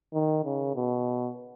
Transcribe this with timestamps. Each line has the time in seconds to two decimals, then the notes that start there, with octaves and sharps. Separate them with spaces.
0.14 D#3
0.45 C#3
0.75 B2